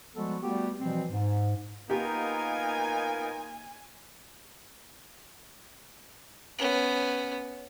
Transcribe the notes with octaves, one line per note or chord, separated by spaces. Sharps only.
F3 G3 G#3 B3 F#4 A4
G3 A3 B3 F#4 G4
B2 E3 F3 G3 C4
G#2
A#3 B3 D#4 F4 G4 A#4 G#5
B3 C#4